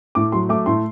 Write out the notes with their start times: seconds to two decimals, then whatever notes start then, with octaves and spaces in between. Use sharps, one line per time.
0.15 A2 D6
0.32 F#3 C6
0.49 A3 D6
0.66 A2 C6